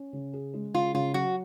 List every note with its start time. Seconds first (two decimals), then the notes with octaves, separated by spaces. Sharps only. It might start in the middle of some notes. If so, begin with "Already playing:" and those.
Already playing: C#4
0.13 C#3
0.33 G#4
0.54 G#3
0.74 C#3 F4
0.94 C#3 F4
1.14 F#3 F#4